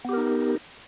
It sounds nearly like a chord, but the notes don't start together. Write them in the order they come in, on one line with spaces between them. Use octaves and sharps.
B3 G4 A#4 D#4